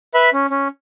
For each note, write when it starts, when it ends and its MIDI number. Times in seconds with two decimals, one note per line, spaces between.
0.14 0.30 71
0.14 0.30 76
0.14 0.30 83
0.33 0.47 61
0.51 0.68 61